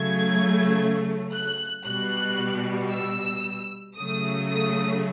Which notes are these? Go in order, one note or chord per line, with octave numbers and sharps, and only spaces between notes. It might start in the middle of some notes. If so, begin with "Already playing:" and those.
Already playing: C#3 F#3 A3 G#6
F#6
B2 G3 F#6
E6
C#3 F#3 A3 D#6
D#6